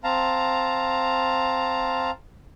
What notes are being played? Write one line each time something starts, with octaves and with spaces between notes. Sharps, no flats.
C4 F5 A5 A#5